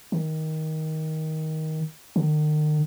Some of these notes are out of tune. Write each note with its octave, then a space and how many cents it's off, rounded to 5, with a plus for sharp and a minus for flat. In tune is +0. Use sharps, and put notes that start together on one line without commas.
D#3 +15
D#3 -40